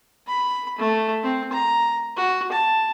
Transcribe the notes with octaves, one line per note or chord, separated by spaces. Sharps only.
B5
A3
C4
A#5
F#4
A5